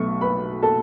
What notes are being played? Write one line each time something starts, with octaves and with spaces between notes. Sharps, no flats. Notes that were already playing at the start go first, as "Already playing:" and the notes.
Already playing: B1 B2 A3 C#6
B4 B5
A4 A5